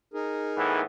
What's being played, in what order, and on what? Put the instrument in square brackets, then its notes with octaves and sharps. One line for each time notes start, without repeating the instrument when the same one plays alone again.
[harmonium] D#4 G#4 A#4
[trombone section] A2 E3 B3